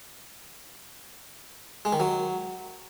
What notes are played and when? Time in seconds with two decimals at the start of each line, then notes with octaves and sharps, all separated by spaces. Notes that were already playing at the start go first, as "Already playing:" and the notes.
1.85 G#3
1.93 D#3
2.00 F#3